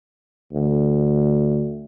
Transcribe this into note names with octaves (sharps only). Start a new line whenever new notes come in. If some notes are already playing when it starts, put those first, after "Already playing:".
D2